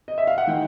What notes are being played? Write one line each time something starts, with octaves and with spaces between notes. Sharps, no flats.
D#5
E5
F5
F#5
D#3 G#3 G5